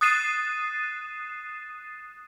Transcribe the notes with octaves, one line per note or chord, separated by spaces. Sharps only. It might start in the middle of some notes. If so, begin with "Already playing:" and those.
D#6 F#6 A6 C7 D#7 E7